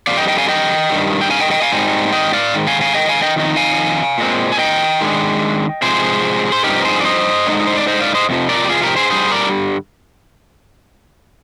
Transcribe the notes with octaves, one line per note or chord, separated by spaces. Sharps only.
F2 D3 G3 D5 F5
D#5 G5
D#5 G5
F5 G#5
D#5 G5
G2 D#3 G3
G5
F5 G#5
D#5 G5
D#5 G5
F5 G#5
G#2 G3 C4 D#4
D#5 G5
D5 F5
G#2 D#3
F5 G#5
F5 G#5
D#5 G5
F5 G#5
D#5 G5
F2 D#3 D#4
F5 G#5
A#2 G#3 C4
G#5
D#5 G5
D#3 G#3 D4
C3 F3 G#3 G#4 C5
C5
G2 F3 C4 D#4 G4 A#4
G#4 C5
D5
C5 D#5
D3 G#3 C4 D#4
C5
D5
C5 D#5
D5 F5
C5 D#5
F2 C3 F3
A#4 D5
G4
F4 G#4
G4 A#4
G#4 C5
G2 D3 G3 G#4 C5
A#4 D5